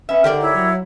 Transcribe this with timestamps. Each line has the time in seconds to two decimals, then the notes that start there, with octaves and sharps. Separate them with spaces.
0.09 B3 C#4 E5
0.24 G#2 D3 G4 A#4 D5
0.40 E4 C#5
0.53 F#3